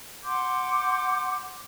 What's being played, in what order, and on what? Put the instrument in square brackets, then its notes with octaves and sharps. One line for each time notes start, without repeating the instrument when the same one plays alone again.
[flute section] F#5 C6 D6 G6